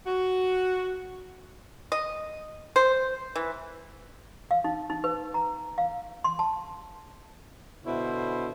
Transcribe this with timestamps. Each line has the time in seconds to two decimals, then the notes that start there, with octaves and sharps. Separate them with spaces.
0.06 F#4
1.92 D#5
2.76 C5
3.36 E3
4.51 F5
4.64 D#4
4.90 D#4
5.04 B4
5.34 A#5
5.78 F5
6.24 C6
6.39 A5
7.85 B2 D3 E4 C5